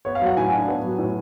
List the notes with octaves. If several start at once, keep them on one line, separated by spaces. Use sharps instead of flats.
B3 C#5
F5
F#3 F#5
A2 G#5
D4
B3
F#3
A2